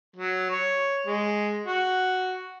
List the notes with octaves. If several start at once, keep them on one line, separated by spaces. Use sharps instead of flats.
F#3
C#5
G#3
F#4